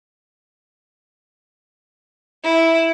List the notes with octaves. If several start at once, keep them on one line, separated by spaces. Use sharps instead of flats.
E4